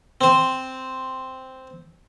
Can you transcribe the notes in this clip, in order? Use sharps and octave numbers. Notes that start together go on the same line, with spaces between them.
C4 C5